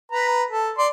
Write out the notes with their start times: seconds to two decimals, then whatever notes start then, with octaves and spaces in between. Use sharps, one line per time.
0.12 B4 A#5
0.50 A4
0.78 D5 C6